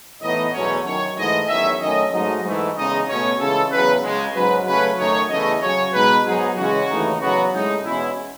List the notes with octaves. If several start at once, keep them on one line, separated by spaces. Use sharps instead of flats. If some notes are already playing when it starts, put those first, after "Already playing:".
A2 E3 B3 D#4 D#5
E2 B2 F#3 A3 C#4 C#5
F#2 D#3 F#3 C#5
G#2 E3 A3 D#4 D#5
E2 D#3 F#3 C#4 E5
F#2 D#3 A3 C#4 D#5
G#2 F#3 A3 D#4 D#5
G#2 E3 A3
E2 C#3 G#3 D#4 D#5
B2 A3 C#4 C#5
C#2 C#3 E3 G#3 A4
E2 C#3 F#3 B3 B4
C#2 C#3 G#3
G#2 F#3 C#4 B4
C#3 F#3 A3 C#4 B4
F#2 D#3 A3 D#4 C#5
E2 C#3 E3 A3 C#4 D#5
C#3 F#3 C#4 C#5
B2 G#3 D#4 B4
G#2 F#3 B3 D#4 G#4
C#3 E3 G#3 C#4 F#4
D#2 C#3 E3 A3 D#4
E2 C#3 F#3 B3 F#4
A2 G#3 C#4 D#4
E2 B2 G#3 C#4 E4